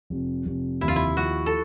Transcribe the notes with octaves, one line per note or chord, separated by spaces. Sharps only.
F1
F1
D#2 E4
F4
E4
F3 F#4
A4